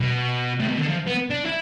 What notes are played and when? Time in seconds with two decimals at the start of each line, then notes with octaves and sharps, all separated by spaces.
0.01 B2
0.59 A2
0.68 B2
0.77 D3
0.87 F3
1.07 B3
1.30 D4
1.45 E4